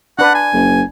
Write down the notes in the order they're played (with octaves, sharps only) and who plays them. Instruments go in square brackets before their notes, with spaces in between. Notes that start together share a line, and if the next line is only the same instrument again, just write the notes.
[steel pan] D4 B4 [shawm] F#5
[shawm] G#5
[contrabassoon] F#1